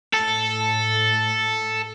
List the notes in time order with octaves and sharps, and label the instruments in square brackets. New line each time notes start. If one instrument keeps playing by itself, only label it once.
[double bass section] A2 [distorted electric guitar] A4